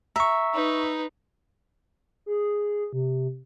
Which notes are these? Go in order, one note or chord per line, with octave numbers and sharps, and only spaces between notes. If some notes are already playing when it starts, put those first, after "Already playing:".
E5 A#5 C#6
D#4 B4
G#4
C3